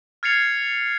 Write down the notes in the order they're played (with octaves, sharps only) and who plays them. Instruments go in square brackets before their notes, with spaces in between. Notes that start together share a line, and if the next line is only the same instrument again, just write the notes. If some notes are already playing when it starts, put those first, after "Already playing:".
[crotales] F6 G#6 A6 C7 C#7 F7